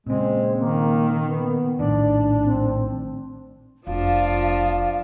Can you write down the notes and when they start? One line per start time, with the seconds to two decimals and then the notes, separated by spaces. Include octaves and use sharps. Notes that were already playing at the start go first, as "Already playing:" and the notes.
0.07 A#2 C#3 G#3 C4
0.59 D#3 A#3
1.25 B3
1.79 A#1 A2 D#3 D4 D5
2.44 C4
3.87 F1 F3 D4 F4 F5